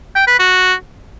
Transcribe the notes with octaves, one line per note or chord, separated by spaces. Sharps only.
G5
B4
F#4